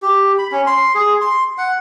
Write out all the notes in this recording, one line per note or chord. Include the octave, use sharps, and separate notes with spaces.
G4
B5
C#4
C6
G#4
C6
F#5